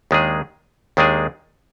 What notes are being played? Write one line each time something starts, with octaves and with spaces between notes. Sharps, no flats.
D#2 D#3 G#3 D4 G#4
D#2 D#3 G#3 D4 G#4